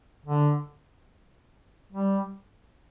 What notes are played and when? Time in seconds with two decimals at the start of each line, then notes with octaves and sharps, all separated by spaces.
0.26 D3
1.92 G3